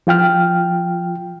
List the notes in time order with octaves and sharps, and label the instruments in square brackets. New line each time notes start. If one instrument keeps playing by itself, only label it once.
[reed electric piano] F3 F4 G5 F6